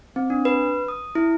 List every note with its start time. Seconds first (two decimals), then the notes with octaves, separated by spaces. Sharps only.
0.16 C4
0.30 D4
0.45 B4
0.88 D#6
1.15 E4